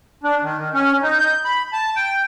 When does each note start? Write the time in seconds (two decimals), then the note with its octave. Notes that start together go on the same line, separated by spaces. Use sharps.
0.23 D4
0.42 D#3
0.58 D#3
0.74 C#4
1.02 D#4
1.18 G6
1.45 B5
1.73 A5
1.96 G5